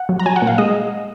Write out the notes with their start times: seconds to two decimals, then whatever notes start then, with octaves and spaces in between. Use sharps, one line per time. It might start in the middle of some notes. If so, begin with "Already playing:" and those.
Already playing: F#5
0.09 F#3
0.19 A#5
0.26 F#3 G#5
0.36 F#5
0.42 A#2
0.47 F5
0.58 G#3 D#5